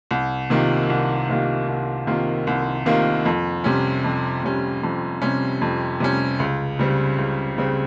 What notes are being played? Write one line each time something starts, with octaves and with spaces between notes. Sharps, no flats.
C2
C3 D#3 A#3 F4
C2
C3 D#3 A#3 F4
C2
C3 D#3 A#3 F4
C2
C3 D#3 A#3 F4
F2
C3 G3 C#4
F2
C3 G3 C#4
F2
C3 G3 C#4
F2
C3 G3 C#4
C#2
C#3 G3 C4
C#2
C#3 G3 C4